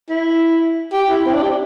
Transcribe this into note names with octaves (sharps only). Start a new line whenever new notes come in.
E4
G4
E4
C4
D4
G4